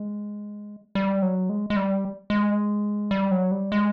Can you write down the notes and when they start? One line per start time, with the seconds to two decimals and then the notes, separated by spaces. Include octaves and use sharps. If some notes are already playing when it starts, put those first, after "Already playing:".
Already playing: G#3
0.95 G3
1.22 F#3
1.49 G#3
1.70 G#3
1.76 G3
2.30 G#3
3.11 G3
3.31 F#3
3.51 G3
3.72 G#3